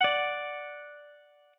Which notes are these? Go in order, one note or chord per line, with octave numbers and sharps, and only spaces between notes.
D5 F#5